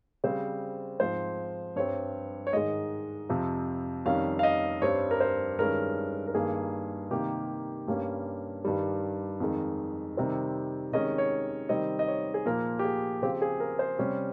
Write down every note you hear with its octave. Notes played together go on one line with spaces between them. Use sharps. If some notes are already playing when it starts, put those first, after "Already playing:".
C#3 G3 C4 C5
G#2 F3 C4 C5
G2 G3 C4 C#5
C#5
G#2 D#3 G#3 D#5
F2 C3 F3
F2 D#3 G3 C#4 F5
F5
D#5
G2 G3 C4 C#5
A#4
C5
G2 D#3 G#3 C#4 A#4
A#4
G2 D#3 A#3 G#4
C3 D#3 A#3 G4
G2 G3 A#3 C#4
G2 D#3 G3
F2 D#3 G#3
C3 D#3 G3 C4
C3 D#3 G#3 C#4 D#5
C#5
C3 D#3 G3 C4 D#5
D#5
C#5
G#4
A#2 F3 A#3 A#4
G4
G#4
C#3 F3 C4 G4
G#4
A#4
C5
C3 G3 C#4